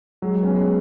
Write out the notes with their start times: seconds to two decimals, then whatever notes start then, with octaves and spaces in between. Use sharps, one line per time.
0.22 F#3 G#3
0.43 B3 C#4
0.55 G#3